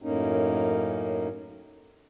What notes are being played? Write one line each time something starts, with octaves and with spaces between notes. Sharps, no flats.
F#2 A2 A#3 C#4 D#4